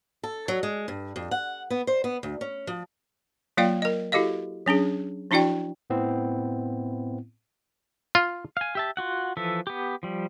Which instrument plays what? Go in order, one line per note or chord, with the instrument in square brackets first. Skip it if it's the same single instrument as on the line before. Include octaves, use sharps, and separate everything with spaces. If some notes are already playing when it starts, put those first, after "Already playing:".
[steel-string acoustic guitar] A4
F#3
G#3
G2
F2
F#5
B3
C5
B3
D2
C#4
F3
[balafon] F#3 A#3 F4 D5 F5 G5
A#4 D#5
E4 F#4 G4 A4 D#5 F5
F#3 C#4 D4 G#4
F3 D4 E4 F#4 D5 G5
[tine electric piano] A2 B3 C4 E4
[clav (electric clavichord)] F4
[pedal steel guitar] F5 G#5
G4 E5 A5
F4 F#4 F#5
E3 F3 A4 E5
B3 G4
F3 G3